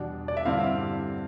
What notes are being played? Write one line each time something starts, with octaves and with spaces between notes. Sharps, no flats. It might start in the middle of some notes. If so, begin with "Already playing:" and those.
Already playing: E2 B2 G3 D4
D5
E5
G2 D3 G3 C4 E4 F5